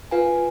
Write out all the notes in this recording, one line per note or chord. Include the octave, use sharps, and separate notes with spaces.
F4 B4 F5 G#5